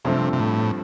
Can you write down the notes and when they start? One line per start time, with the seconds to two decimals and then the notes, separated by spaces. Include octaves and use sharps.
0.05 G2 C3 F3 A3 C4
0.33 C3
0.40 A2